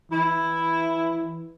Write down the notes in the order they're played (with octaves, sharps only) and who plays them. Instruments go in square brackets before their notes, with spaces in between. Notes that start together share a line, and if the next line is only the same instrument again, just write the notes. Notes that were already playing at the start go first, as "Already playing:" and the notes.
[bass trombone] E3 [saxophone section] E4